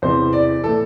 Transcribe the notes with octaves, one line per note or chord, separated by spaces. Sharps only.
E2 C3 E3 C5
D5
A2 E3 A4